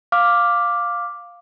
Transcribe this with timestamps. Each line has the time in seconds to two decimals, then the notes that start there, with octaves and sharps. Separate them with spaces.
0.12 F5 D6 F6